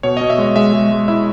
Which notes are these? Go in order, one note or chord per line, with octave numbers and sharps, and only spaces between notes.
B2 C#5
B2 D#5
E5
G#3 D#5
G#3 E5
G#3
G#3
E4 E5